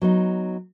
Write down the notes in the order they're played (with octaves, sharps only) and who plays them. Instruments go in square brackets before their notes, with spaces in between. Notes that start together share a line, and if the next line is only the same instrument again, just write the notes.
[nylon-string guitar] F#3 B3 D#4